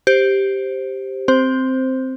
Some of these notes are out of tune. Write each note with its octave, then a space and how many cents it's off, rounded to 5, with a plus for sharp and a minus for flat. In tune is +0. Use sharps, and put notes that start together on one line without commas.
G4 +0 C5 +5
C4 +0 C5 +0